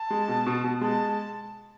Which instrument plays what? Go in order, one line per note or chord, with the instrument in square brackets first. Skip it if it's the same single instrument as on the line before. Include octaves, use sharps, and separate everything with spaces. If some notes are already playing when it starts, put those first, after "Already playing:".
Already playing: [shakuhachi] A5
[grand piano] G#3
B2
B2
B2
[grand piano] G#3 [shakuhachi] A5